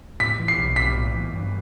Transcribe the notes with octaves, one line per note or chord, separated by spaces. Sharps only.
A2 B6
E3
C7
B1
B1 B6
A2
E3
G2